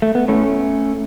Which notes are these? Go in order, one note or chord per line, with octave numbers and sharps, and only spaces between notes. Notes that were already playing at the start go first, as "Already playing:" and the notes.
A3
B3
A2 A3 C#4